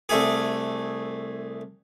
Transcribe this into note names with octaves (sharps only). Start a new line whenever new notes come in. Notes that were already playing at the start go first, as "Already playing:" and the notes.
C2 A3 G#4